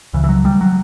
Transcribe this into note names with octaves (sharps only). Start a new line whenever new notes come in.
C#2 C#3 E3
E3
F#3
G3
F#3